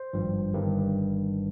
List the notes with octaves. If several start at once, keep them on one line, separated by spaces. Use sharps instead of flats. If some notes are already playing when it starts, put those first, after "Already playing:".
Already playing: C5
G#1 G2 F3
G1 G2 D#3